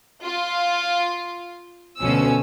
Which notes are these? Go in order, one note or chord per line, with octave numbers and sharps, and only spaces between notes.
F4
D2 B2 F3 C#4 E6